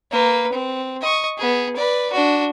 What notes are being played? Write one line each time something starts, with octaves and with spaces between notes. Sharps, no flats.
A#3 B4
C4
D#5 C#6
B3 G#4
B4 D5
D4 F#4